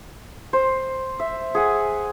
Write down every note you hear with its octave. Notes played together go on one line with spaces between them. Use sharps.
C5
E5
G#4 F#5 G#5